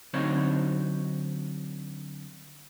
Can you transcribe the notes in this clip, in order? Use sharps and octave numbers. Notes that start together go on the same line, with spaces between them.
D3 F#3 C4 D#4 C#5